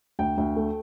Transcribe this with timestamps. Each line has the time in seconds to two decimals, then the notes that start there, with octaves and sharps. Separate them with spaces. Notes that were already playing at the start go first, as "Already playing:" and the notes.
0.19 D2 G5
0.38 D2
0.56 A3